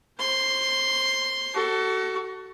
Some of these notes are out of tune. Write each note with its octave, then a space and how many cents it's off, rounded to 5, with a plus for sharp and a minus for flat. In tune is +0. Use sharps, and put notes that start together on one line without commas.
C5 +30 C6 +0
F#4 +30 A4 +15